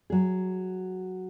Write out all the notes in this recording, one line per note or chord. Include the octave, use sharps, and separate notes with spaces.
F#3 G#4